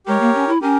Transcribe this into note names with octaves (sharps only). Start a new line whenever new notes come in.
G#3 G4 A#4 C#5
A#3
C#4
E4
C#4 G4 A#4